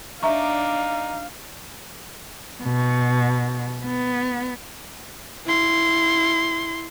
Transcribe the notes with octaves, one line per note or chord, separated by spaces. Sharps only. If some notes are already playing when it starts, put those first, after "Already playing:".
D4 D#4 D5 E5 F5 A#5 C#6
B2
B3
E4 C6